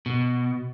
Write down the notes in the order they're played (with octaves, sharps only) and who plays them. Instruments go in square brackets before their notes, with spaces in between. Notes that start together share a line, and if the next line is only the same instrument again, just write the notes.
[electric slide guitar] B2